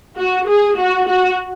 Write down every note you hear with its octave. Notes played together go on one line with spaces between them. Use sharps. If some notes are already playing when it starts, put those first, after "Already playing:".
F#4
G#4
F#4
F#4